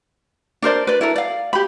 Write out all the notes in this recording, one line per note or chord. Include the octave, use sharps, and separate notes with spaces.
D4 A#4 C5 D5
B4 D5
E4 A4 A#4
D5 F5
G4 B5